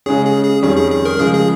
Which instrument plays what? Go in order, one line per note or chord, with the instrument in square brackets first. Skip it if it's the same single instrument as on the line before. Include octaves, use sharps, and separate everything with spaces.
[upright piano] C#3 G#3 C#4 [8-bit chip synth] G#4
[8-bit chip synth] G#4
G#4
[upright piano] F2 D#3 G3 C#4 [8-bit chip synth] G#4
[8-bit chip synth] G#4
G#4
A#4
[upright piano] C#3 F3 G#3 [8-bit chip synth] G#4
[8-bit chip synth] G#4